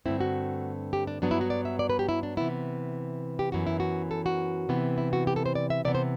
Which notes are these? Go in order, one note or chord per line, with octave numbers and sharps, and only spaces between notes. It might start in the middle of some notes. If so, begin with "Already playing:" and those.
G2 D3 A3 C4 E4
F#4
G4
D4
G2 F#3 B3 D4
E4
F#4
D5
E5
D5
B4
G4
E4
D4
C3 E3 B3 E4
G4
F#2 E3 B3 F#4
E4
F#4
A4
F#4
C3 E3 B3
E4
F#4
G4
A4
C5
D5
E5
C3 E3 B3 D5
C5